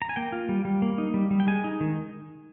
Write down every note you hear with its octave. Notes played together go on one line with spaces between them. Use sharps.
A#5
G#5
A#3 G5
F4
G3
G3
A#3
D#4
G3
G3
G5
G#3 G#5
D#4
D#3